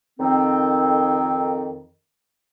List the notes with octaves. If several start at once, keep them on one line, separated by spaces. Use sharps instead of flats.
F2 D#3 C4